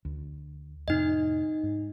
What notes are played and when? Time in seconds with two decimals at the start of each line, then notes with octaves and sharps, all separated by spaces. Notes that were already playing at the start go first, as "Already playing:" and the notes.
0.05 D2
0.88 F2 A2 C3 D#4 D#5
1.63 G#2